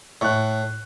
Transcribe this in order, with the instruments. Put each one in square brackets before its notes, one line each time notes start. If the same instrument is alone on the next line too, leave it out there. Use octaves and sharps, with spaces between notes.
[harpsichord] A2 [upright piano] C#6 F#6